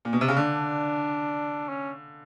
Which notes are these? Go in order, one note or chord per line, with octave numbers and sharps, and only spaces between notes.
A#2
B2
C3
C#3
D3 D4
C#4